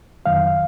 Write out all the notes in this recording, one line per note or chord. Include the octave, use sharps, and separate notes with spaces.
F2 D#3 F#3 F5